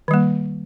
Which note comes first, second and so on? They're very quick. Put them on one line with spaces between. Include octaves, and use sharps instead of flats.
D#3 G3 A#3